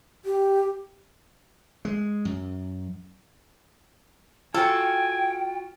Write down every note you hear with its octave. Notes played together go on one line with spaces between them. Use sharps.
G4
G#3
F#2
F4 F#4 A4 G5 G#5